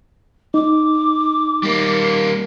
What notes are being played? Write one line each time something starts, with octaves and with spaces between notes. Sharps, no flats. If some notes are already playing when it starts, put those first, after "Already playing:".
D#4 D6
G3 A#3